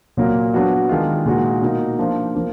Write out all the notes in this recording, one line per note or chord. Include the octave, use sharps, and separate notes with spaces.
A#2 F#3 A#3
F#3 B3 D4 F#4
D#3 G#3 D4 F4
A#2 G#3 D#4 F#4
B2 A#3 D#4 F#4
F3 A#3 D4 F4
F3 A#3